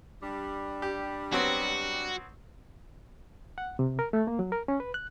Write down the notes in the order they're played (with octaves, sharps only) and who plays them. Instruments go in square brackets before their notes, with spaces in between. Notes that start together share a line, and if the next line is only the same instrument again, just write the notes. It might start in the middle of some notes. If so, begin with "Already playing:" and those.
[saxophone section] G3 D4
[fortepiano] G4
[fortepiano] F#3 B3 C4 [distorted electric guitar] F#4
[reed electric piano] F#5
C3
A#4
A3
A#3
F#3
A#4
C#4
B4
F#6